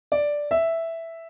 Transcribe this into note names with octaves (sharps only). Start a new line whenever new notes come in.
D5
E5